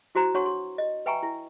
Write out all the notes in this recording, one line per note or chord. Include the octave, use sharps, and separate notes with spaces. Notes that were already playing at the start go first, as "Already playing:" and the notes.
E4 F#4 C5 A#5
D4 F#4 C#5 F#5 C6 C#6
C6
D#5
B4 E5 G5 G#5 A#5 C#6
E4